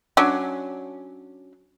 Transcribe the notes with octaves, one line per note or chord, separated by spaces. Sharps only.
F#3 C#4 D4